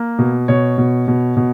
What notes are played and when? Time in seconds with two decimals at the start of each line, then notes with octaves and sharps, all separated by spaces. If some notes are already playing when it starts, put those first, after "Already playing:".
Already playing: A#3
0.19 B2
0.48 B2 C#5
0.78 B2
1.08 B2
1.37 B2